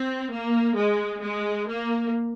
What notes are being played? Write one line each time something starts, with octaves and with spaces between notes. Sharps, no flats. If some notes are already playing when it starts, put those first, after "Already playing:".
Already playing: C4
A#3
G#3
G#3
A#3